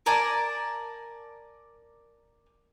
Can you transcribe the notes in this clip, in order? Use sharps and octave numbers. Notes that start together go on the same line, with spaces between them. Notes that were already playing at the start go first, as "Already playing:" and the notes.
A#4 D5 G#5 A5